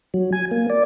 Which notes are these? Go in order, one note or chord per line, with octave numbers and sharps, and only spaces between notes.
F#3
G#5
A#3
D5